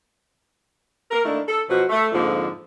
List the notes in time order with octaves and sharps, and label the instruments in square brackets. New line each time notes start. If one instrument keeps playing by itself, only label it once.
[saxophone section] A#4
D#3 A3 A#3 D4 E4
A4
B2 F3 F#3 F#4
A3
F2 G#2 D3 F3 A#3